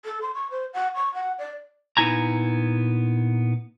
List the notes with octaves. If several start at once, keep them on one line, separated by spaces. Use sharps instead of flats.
A4
C6
C#6
C5
F#5
C#6
F#5
D5
A#2 B3 D#4 E4 G#5 A#5